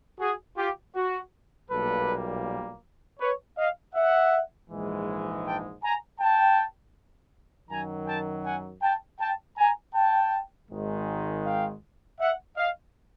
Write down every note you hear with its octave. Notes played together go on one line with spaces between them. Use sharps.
F#4 G#4
F4 G4
F#4
B1 A#2 G3 A#3 A4 B4
B4 C#5
D#5 F5
E5 F#5
A#1 G#2 E3 G#3
G5 A5
G#5 A#5
G5 A5
F#2 D#3 F#3 G#5 A#5
G5 A5
F#5 G#5
G5 A5
G5 A5
G#5 A#5
G5 A5
G#1 G#2 D#3 G#3
F5 G5
E5 F#5
D#5 F5